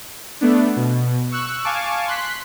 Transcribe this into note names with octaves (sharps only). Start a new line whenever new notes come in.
A3 B3 D4
B2
C#6 E6 F#6
F5 G#5 A5 C#6 D6
C6 F#6 B6